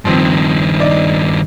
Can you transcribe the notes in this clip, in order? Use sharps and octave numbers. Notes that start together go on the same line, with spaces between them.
G2 D#3 F3 C4
D#4 D5